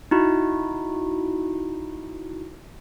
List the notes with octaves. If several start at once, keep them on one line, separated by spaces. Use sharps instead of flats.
D#4 E4 F#4